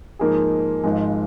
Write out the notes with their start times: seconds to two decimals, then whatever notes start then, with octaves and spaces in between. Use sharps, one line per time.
0.19 G#2 F3 A#3 D#4 G#4
0.84 G#1 G#2 F3 G#3